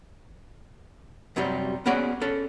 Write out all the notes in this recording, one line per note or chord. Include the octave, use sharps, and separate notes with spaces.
F#2 C3 F#3 G3
B3 C#4 F#4 G#4 D5
C#4 A4